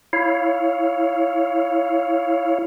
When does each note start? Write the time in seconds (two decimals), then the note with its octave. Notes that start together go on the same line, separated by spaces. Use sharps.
0.13 E4 C#5 F5